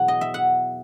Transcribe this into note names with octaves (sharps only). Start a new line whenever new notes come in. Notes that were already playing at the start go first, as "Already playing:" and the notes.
Already playing: E2 B2 F#3 F#5
D#5
E5
F#5